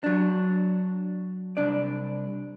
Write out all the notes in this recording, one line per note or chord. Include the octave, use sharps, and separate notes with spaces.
F#3 D4
C2 D4 D5